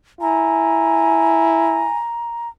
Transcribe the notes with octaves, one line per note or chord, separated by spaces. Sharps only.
E4 G#5 A#5